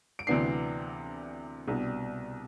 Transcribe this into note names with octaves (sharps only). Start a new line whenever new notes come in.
D7
D2 C3 E3 B3 D4 C7
C2 B2 G3 D4